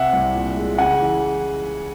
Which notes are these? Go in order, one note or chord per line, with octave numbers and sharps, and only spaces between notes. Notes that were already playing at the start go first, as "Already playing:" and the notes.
Already playing: C3 E5 F#5
C2
A#2
G#3
C#3 F#5 G#5
E3